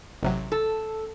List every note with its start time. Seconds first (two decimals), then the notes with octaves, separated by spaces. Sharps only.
0.23 A1 C3 F#3
0.52 A4